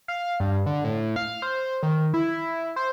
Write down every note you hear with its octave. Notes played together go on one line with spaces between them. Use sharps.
F5
G2
D3
A2
F5
C5
D#3
E4
C5